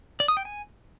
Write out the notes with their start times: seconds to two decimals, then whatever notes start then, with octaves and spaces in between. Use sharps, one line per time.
0.20 D5
0.28 D#6
0.37 G5
0.45 G#5